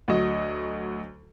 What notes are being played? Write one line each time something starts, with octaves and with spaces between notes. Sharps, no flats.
D2 F#3 F#4 D#5